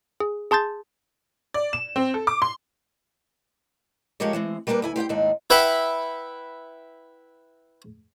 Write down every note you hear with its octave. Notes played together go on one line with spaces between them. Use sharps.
G#4
G#4 A5 C6 G6 A6
D5
E7
C4
A4
D6
C6
F3 G#3 C#4 G4 A#4 C#5
E3 G#3 C4
G3 A#3 D4 F#4 A#4 B4
D2 E4 G#5
G4 C5 F#5 G5
D#2 G#2 C4 D4 D#4
E4 B4 E5 F#5 G5 B5